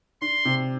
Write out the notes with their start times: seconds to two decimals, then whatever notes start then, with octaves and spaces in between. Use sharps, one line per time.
0.21 D4 C6
0.45 C3